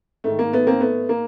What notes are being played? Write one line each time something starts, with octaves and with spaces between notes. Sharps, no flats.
G#2 D#3 A3
A#3
A3 B3
A#3 C4
A3 B3
A#3